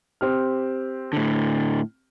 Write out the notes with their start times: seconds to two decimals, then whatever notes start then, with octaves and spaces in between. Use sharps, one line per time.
0.21 C4 G4 F6
1.13 A2 D3